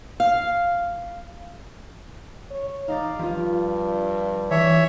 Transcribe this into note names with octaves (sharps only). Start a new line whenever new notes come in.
F5
C#5
D#4 D5 D#5 F5
G2 F3 F4
E3 C#5 E5